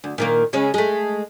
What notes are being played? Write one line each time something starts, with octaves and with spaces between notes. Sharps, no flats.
D2
A#2 D#3 A#3
C#3 G#3 C#4
G#3 A3